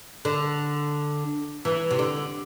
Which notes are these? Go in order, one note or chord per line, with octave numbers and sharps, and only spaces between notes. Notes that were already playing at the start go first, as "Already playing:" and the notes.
D3
E3
C3
D3